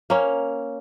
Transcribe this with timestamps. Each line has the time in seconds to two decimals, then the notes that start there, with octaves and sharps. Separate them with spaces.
0.10 A#3 C#4